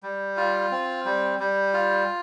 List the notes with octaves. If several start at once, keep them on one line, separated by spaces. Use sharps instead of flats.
G3
F4
C4
G3
G3
F4